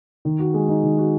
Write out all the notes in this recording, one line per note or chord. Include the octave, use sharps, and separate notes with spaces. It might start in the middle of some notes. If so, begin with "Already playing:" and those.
D#3
F#4
G#3
D#4
D#3
F#4